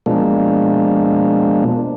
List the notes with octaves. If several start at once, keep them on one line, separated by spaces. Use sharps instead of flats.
B2 F3 G#3 A#3 D4